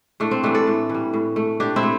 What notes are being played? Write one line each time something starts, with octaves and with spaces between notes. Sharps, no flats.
A2 A3 D4
C4
E3 G3 A3 D4
A4 D5
A2
E3
G3
A2
A3
A2 D4 G4
C4 E4
A3